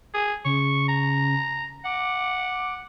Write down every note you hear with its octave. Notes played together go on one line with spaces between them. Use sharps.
G#4
C#3 C#6
A#5
F#5 D6